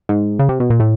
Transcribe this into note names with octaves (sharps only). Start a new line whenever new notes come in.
G#2
C#3
C3
B2
A#2
A2